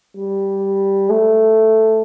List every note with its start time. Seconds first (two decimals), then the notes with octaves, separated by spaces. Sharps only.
0.17 G3
1.10 A3